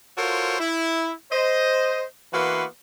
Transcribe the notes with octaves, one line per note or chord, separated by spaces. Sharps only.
F4 F#4 A4 A#4 C5 C#5
E4
C5 D#5
E3 A#3 B3 F#4 B4 C6